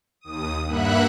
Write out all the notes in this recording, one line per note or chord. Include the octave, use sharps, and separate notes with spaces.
D#2 D#6
G2 A#3 E5 F#5 B5 F#6